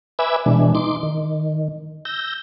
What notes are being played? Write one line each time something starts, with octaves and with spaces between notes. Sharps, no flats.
B4 E5 G#5 B5 D6 E6
B2 E3 G#3 D4
D#4 C6 D6
D#3
E6 G6 A#6